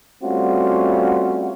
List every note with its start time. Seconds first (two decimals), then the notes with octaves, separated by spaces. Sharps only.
0.23 G3 A3 C4 C#4 F4 F#4